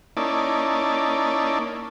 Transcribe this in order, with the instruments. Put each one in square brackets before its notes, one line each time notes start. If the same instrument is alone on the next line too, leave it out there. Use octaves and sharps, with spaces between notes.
[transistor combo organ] A#3 C#4 D#4 E4 D5 A5